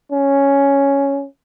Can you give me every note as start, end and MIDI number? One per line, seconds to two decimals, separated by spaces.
0.12 1.26 61